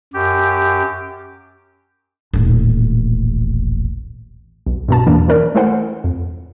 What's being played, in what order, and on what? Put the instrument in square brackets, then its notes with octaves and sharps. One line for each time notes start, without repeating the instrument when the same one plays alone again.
[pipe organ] F#2 G4
[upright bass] D#1 A1
[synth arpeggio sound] B1
G2 B2 A5
E2 A2 E3 A#3 D4
E3 C#4 A#4 D5
G#3 A3 E4 A#4 C5 F#5
F2